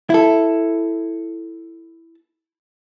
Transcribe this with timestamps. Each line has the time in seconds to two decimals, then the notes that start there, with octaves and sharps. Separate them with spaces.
0.10 E4 A4